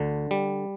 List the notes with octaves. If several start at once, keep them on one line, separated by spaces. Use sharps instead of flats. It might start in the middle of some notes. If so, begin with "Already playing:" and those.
Already playing: D2 D3
G3